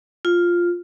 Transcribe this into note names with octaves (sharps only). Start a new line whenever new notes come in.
F4